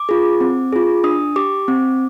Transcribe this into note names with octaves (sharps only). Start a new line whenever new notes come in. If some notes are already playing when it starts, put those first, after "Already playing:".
Already playing: D6
F4 G#4
C4
F4 G#4
D4 D#6
G4 D6
C4